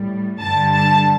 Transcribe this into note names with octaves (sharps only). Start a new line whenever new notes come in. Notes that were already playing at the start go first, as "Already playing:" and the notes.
Already playing: A2 G3
G2 D3 G3 A5
A5